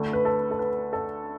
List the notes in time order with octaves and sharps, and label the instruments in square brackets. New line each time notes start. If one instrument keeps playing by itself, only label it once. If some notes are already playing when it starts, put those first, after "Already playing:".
Already playing: [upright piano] D2 D3 A3
B4
A4
A4
B4
A4